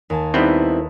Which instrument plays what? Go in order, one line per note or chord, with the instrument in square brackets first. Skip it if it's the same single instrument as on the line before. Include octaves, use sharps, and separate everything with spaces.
[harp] D#2 G#5 A5
[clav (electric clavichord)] G3 B3 C4 [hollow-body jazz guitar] D#4 E4 [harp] A4 B4